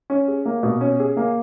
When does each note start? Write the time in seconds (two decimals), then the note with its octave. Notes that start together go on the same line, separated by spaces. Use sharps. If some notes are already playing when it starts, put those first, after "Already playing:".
0.10 C#4
0.28 G#4
0.46 A#3
0.63 B2
0.81 C#4
1.00 G#4
1.17 A#3